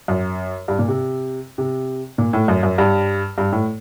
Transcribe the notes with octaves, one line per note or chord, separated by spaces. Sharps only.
F#2
G2
A#2
C3
C3
A#2
A2
F#2
F#2
G2
G2
A2